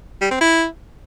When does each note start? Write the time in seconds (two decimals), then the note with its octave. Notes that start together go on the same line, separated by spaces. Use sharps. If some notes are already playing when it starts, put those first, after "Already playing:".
0.22 G3
0.31 C4
0.41 E4